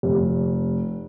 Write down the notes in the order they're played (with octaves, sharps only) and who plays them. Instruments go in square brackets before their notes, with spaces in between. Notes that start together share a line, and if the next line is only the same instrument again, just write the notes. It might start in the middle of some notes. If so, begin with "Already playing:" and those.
[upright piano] F1